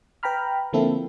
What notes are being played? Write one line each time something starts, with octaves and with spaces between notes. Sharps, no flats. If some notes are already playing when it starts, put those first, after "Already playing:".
B4 G5 A#5 B5 F6
D3 F3 A#3 C4 E4 A4